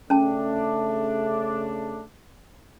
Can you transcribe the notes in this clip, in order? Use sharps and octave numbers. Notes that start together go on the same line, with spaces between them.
C#3 A3 C#4 D4 A5